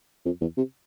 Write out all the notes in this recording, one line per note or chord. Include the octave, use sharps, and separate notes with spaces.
F2
E2
C3